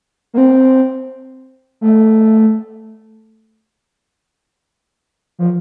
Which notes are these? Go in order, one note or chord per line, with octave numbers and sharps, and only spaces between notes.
A#3
C4
A3
F3